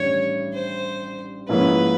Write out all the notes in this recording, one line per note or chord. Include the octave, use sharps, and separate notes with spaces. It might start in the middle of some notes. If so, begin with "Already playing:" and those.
Already playing: A1 G2 D#3 G3 C#5
C5
G#2 F3 A#3 C#4 E4 B4